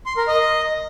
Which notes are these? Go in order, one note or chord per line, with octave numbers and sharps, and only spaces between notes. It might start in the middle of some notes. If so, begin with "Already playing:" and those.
C6
A#4
D#5